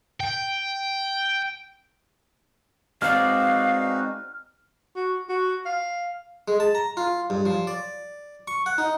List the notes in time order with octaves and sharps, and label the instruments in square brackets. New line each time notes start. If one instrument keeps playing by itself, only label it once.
[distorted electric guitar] G5
[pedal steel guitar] G#3 C4 D5 [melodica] D#4 F#4 B4 [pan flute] F5 [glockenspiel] F6
[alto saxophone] F#4
F#4
F5
[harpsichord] G#3
A5
A#5
F4
G2
F3
D5
C#6
F#5
D#4